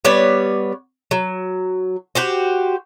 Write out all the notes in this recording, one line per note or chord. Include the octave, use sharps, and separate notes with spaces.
G3 B3 C#5 D5
F#3
F#4 G4 C5